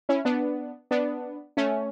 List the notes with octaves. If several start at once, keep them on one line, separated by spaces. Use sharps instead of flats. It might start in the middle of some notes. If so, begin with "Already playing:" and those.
C#4 E4
B3 D4
B3 D4
A3 C#4